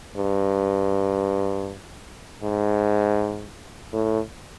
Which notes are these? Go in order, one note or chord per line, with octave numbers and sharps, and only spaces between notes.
G2
G#2
A2